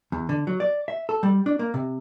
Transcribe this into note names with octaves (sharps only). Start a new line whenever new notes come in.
E2
D3
F#3
D5
E5
A4
G3
D4
A#3
C3